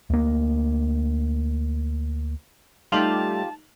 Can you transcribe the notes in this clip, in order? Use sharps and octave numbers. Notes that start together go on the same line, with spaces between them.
D2 A#3
G3 A3 D#4 F4 G4 A5 F7 F#7